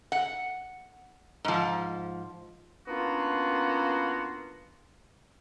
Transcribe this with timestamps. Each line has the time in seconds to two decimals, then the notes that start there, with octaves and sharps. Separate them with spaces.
0.12 F#5
1.45 G#2 F3
2.87 A#3 B3 C#4 D4 F4 F#4